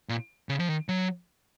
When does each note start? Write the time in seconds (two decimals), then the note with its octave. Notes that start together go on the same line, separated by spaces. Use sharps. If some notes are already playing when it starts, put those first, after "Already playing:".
0.09 A#2
0.49 C#3
0.60 F3
0.68 D#3
0.89 F#3